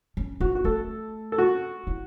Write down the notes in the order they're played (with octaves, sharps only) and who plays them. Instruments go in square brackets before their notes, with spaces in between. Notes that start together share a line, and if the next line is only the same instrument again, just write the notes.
[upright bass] C#4
[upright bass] B3 [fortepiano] F#4
[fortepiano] F#4
[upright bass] A3 [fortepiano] A4
[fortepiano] A4
F#4
[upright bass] E4